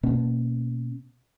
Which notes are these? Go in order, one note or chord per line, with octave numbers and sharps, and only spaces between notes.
B2 A#3 C#4